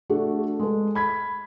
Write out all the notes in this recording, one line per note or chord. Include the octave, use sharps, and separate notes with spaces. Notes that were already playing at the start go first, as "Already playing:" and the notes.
A3 D4 F#4
G#3 A4
B5 G#6 B6